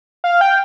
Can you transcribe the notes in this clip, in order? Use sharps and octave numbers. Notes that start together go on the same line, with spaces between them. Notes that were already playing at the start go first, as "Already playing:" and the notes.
F5
G5